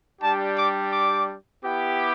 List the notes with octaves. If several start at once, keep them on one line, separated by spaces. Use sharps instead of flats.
G3 D4 G4 A5
D6
D6
B3 E4 G4